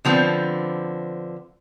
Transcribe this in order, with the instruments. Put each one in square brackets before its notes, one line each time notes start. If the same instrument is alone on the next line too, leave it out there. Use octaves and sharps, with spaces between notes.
[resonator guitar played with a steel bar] D3 F3 B3 C4